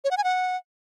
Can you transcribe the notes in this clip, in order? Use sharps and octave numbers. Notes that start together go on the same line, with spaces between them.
C#5
F#5
G#5
F#5